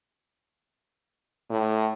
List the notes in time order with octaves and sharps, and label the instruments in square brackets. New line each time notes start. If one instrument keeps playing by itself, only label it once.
[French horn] A2